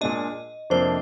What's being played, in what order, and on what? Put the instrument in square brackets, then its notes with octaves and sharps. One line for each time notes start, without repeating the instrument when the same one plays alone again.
[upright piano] A#2 G#3 D4 [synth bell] D#5
[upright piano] F2 C3 F3 A#3 D4 [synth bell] C5